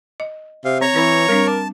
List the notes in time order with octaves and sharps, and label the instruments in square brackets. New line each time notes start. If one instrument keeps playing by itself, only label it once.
[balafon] D#5
[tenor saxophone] C3 [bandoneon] F5
[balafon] C4 [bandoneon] C#5 A#5 C#6
[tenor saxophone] E3 [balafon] C4 B4 B5
[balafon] G3 C4 D4 [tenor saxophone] A#4
[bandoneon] A5 [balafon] D6